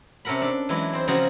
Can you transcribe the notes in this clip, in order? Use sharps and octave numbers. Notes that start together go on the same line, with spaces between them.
C3 C#4 A4 A#4 F#5 B5
D4 A4
E3 F#3 G#3 D4 E4
C4 C5
C#3 F3 C4 F#4 G#4 A#4